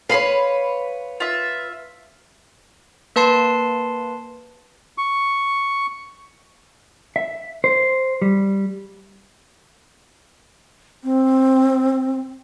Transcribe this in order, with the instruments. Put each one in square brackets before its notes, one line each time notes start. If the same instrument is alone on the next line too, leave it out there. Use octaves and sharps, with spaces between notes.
[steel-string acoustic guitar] B4 C#5 [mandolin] F5 B5 C6
[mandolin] F4 E5
[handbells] A#3 B4 A5 C6 C7
[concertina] C#6
[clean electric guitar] E5
C5
G3
[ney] C4